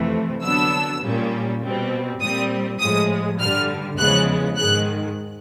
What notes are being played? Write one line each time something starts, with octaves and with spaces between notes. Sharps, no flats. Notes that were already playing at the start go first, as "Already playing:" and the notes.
Already playing: F2 C3 E3 A3
D3 F#3 B3 D4 E6
A#2 G3 A#3 C#4
B2 G3 C4
A#2 G3 C4 D#6
A2 F3 G#3 D#6
G2 D3 G3 F6
E2 C#3 F3 G#3 B3 F#6
G#2 D#3 G#3 F#6